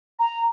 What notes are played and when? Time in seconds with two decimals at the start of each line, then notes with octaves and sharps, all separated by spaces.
0.19 A#5